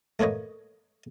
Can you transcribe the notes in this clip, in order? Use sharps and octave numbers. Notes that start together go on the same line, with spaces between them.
A3 A#3 B4 C#5 D#5